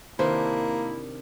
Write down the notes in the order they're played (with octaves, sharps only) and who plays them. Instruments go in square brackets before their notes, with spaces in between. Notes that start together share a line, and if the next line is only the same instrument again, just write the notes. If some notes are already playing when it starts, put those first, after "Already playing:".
[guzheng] C3 D#3 D4 [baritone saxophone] A#3 [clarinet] E4 [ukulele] C5